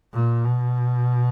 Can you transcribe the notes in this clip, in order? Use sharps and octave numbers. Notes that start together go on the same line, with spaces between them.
A#2
B2